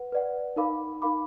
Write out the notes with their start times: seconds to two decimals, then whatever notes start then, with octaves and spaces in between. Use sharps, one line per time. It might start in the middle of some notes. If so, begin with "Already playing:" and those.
Already playing: B4 F#5
0.12 B4 D5 F#5
0.56 D#4 A#4 F5 B5 D6
1.02 D#4 A#4 F5 B5 D6